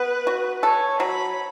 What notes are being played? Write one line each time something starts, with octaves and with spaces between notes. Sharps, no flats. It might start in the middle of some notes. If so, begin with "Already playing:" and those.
Already playing: B3 B4
F#4
A4 C#5
F#3 B5